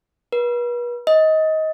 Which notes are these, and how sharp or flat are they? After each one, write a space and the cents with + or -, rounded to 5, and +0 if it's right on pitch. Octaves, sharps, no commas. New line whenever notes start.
B4 -40
D#5 +20